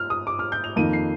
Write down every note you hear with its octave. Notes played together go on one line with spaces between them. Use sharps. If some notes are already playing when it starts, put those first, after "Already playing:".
Already playing: F6
D#6
D6
F6
G6
F7
F2 D#3 A#3 D#4 D#7
C7